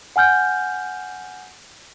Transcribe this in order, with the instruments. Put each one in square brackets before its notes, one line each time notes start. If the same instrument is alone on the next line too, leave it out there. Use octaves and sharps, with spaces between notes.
[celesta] F#5 G#5 F6 G6